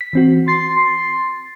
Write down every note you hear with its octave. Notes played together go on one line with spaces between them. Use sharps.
B6
E3 C4 F#4
C6 A6
C6